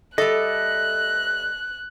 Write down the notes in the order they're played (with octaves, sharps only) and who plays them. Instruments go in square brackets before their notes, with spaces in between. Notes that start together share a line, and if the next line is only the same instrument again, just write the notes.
[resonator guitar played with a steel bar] G3 A4 [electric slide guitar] D#5 E5 [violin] F#6